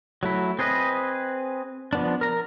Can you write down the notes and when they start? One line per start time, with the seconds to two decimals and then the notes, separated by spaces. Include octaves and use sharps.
0.23 F#3 A3 E4
0.59 C4 G#4 B4 D#5
1.93 F3 B3 D4
2.21 A#4 A#5